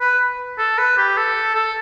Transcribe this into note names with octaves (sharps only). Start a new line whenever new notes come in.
B4
A4
B4
G4
A4
A4